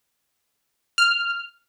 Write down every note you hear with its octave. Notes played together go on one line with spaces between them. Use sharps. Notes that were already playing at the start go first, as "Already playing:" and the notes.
F6